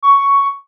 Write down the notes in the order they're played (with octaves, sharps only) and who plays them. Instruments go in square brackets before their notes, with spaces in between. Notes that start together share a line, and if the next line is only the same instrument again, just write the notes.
[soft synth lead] C#6